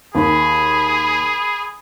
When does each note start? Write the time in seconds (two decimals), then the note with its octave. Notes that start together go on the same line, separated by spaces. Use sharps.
0.15 D#2 G#4 B5